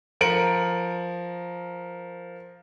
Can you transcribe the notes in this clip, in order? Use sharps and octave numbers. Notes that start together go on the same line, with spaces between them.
F3 A#4 C#7 D7 F#7